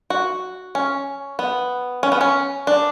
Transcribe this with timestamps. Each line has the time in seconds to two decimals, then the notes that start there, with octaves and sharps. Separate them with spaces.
0.10 F#4
0.75 C#4
1.39 B3
2.03 C#4
2.12 B3
2.21 C#4
2.67 D4